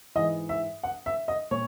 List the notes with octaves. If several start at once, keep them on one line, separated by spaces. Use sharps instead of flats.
G#2 E3 D#5
E5
F#5
E5
D#5
A#2 C#5